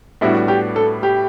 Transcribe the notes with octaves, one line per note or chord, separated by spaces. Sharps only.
A2 G3 B3 D4 E4 F#4
G4
A4
G4